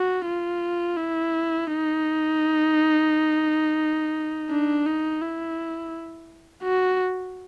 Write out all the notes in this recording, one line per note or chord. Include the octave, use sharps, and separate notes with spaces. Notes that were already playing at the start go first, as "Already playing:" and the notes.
Already playing: F#4
F4
E4
D#4
D4
D#4
E4
F#4